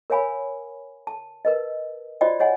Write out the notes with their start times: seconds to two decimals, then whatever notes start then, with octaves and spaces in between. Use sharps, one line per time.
0.10 A#4 C#5 F5 G#5 B5
1.07 A5
1.45 A#4 B4 D#5
2.21 F4 F#4 C5 D5 D#5 G5
2.40 C#5 D#5 F#5 G#5